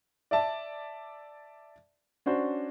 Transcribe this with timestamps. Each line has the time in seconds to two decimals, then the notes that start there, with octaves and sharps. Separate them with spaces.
0.31 D5 E5 A5
2.26 C#4 D4 F#4 C5